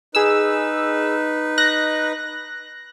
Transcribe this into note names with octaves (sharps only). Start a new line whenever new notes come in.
D#4 G#4 B4 E6
F#6 A#6